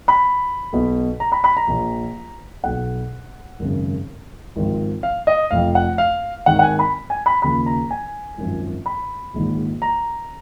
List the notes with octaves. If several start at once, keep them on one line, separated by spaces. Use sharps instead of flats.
B5
B1 B2
A#5
B5
B5
A#5
A#1 A#2 F3
B1 B2 F#5
G#1 F#2 C#3
G#1 G#2 F3
F5
D#5
F1 F2 F3 F5
F#5
F5
G#1 G#2 D#3 F#5
F#5
G#5
B5
G#5
B5
D#2 C#3 F3 B5
A#5
G#5
G#1 F#2 F3
B5
A#1 G#2 D#3
A#5